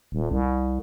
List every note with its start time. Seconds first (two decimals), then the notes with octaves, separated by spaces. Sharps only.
0.12 D#1
0.31 C2